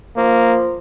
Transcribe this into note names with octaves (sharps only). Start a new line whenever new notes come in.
F3 A#3